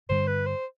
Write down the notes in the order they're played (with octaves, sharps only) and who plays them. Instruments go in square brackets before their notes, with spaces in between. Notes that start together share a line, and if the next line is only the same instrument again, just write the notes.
[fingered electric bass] G2 D3 G3 D4 [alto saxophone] C5
[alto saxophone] B4
C5